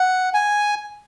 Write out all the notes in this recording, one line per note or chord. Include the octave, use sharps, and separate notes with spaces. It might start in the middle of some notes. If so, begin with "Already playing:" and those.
Already playing: F#5
G#5